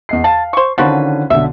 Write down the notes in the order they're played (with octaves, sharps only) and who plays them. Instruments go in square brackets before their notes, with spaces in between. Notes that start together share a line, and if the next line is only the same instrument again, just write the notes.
[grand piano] E2 D#5 C7
[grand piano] F5 [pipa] A5
[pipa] C5 C#6
[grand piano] D3 D#3 C#4 [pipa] F3 F#4 B4
[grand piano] B1 D3 [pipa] E5